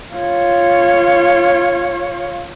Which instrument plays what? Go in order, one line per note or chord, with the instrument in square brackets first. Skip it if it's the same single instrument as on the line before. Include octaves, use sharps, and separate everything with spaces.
[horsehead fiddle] F4 C#5